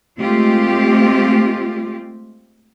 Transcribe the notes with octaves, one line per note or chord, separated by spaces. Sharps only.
G#3 A3 C4 F4 G4